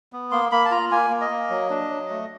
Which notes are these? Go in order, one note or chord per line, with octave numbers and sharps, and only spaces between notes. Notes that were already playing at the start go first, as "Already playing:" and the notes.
B3
A#3 C6
A#3 B5
A5
F4 A#5
A#3 G#5
A#3
D#5
A#3
F#3
D4
F#3
A3